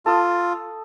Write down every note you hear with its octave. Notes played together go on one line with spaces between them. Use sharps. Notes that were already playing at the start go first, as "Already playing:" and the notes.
F4 A4 D#6